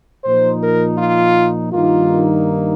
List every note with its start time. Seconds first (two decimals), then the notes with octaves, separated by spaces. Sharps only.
0.25 A#2 F3 D#4 C5
0.62 A#4
0.98 F4
1.72 G2 D#3 A#3 D#4 F4